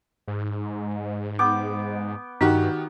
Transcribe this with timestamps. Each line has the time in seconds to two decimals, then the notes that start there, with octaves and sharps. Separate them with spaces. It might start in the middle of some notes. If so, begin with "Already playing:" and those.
0.27 G#2
1.39 B3 G5 D6
2.41 G2 D#3 D#4 F#4 G4